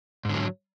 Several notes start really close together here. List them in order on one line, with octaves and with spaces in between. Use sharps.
G#2 D3 F#3